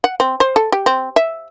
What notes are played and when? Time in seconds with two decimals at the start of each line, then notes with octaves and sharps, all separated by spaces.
0.04 F#5
0.20 C4
0.40 C5
0.56 A4
0.72 G4
0.86 C4
1.16 E5